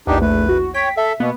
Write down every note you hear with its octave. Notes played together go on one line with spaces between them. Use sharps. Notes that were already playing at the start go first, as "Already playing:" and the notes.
A#1 E2 D4 D#4 G4
A3 B4
F#4
C#5 G5 B6
A4 E5
B2 A#3 B3